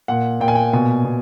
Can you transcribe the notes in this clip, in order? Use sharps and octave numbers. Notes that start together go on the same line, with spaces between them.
A#2 F#5
A#2 G5
G#5
G5
B2 G#5
B2